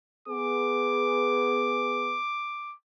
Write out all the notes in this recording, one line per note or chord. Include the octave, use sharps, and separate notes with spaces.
B3 G#4 D6